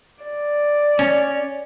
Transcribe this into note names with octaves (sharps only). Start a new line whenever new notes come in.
D5
C#4